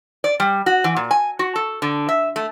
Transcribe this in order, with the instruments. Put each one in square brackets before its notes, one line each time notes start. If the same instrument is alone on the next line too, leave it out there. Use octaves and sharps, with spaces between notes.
[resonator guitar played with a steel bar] D5
G3
F#4
E3
A#2
G#5
F#4
A4
D3
E5
A3